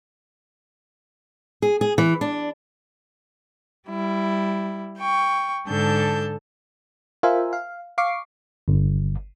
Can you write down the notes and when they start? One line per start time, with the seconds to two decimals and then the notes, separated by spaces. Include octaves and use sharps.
1.62 G#4
1.81 G#4
1.98 E3
2.21 D4
3.89 G3 E4
4.97 G5 C#6
5.67 G#2 D3 A4 A5 G6
7.23 F4 A#4 C5 E5 F5 G#5
7.53 F5
7.98 F5 C#6 D6 C7
8.68 G1